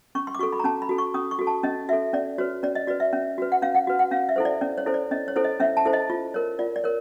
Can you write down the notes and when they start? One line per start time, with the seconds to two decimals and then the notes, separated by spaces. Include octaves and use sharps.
0.15 C#4 C#6
0.27 C6
0.35 D6
0.39 F#4 A4 C#6
0.52 B5
0.59 A#5
0.64 C#4 A5
0.82 B5
0.89 F#4 A4
0.98 C#6
1.14 C#4 D#6
1.31 C#6
1.39 F#4 A4
1.47 A5
1.63 C#4 D#5
1.89 F#4 A4 E5
2.13 C#4 D5
2.38 F#4 B4 C#5
2.63 C#4 D5
2.75 D#5
2.87 F#4 B4 D5
3.00 E5
3.13 C#4
3.38 F#4 B4
3.52 F#5
3.62 C#4 F5
3.75 F#5
3.87 F#4 B4
3.99 F#5
4.11 C#4 F5
4.29 E5
4.36 E4 A4 C5
4.45 D5
4.61 C#4 D5
4.78 C#5
4.86 E4 A4 C5
4.94 D5
5.11 C#4 D#5
5.28 C#5
5.36 E4 A4 C5
5.44 D#5
5.60 C#4 E5
5.77 A5
5.85 E4 A4 C5
5.93 D#5
6.10 F4
6.34 A#4 C#5
6.59 F4 D5
6.76 D5
6.84 A#4 C#5